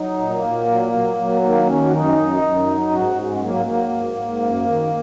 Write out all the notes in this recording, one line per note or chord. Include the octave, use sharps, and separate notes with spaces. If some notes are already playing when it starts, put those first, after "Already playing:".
Already playing: F#3 D#4
A#2
A#3
A#2
F#3
F#3
F#3
D#3 A#3
D#3 C#4
F#4
F#2 D#4
F#2
F#2
F#3
G#2 F#4
G#2 G#3
C#4
F#3 A#3
F#3 A#3
G#2
G#2
F#2
D#3